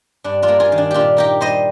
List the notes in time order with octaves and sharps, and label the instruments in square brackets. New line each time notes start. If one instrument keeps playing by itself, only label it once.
[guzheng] G2 D4
D4 F4
A#3
F4 G#4
D#3
D4
A#2 D4 F4 G4
A#3 D#4 G4
G3 C5 D#5